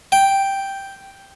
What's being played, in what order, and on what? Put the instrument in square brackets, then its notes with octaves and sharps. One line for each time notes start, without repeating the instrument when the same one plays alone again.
[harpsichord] G5